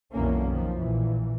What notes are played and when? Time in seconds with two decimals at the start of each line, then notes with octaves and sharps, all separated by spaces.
0.13 B1 F2 D3 E3 A#3 C#4
0.46 F2 D#3 F3
0.78 A#1 A#2 E3